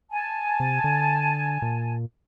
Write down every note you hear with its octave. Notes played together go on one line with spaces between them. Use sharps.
G#5 A5
C3
D3
A#2